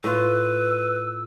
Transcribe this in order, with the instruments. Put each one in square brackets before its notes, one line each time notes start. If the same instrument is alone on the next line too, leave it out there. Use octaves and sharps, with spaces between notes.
[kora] A2 F4 [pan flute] B4 [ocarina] E6